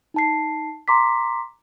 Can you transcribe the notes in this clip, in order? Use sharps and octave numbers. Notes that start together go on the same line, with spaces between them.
D#4 A5 C7
A#5 C6 D6 B6